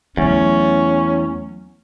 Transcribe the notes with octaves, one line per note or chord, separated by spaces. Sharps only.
E2 F#3 A3 C#4